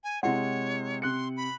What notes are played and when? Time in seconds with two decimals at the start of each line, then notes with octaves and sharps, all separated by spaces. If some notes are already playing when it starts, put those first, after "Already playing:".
0.04 G#5
0.23 C3 G#3 E4 C#5 F#5
1.02 C3 C6 F#6 C#7
1.37 B5